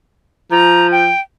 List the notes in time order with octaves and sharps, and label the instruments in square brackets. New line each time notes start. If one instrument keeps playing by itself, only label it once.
[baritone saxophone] F3 [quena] A#5
[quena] G5